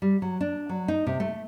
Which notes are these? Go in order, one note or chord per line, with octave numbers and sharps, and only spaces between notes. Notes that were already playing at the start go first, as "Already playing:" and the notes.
G3
F#3
D4
F#3
D#4
C3
A3